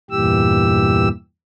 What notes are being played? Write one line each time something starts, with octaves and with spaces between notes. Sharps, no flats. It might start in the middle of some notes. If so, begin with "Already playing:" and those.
E2 G2 A#2 E3 G4 E6